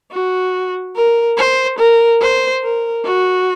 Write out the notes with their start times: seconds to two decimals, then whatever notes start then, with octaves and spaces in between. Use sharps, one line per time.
0.11 F#4
0.96 A#4
1.38 C5
1.79 A#4
2.21 C5
2.63 A#4
3.05 F#4